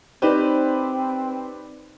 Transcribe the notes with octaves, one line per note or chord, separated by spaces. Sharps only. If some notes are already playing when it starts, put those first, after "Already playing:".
C4 D#4 G4 B4 C5 D5